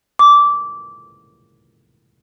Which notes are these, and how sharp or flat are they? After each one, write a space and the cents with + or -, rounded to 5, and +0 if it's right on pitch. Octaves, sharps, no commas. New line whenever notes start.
D6 -15